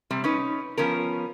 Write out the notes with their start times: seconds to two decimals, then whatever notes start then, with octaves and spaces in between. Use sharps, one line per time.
0.11 C3 G3 C4
0.24 C#4 D#4 B4
0.78 F3 B3 C#4 A#4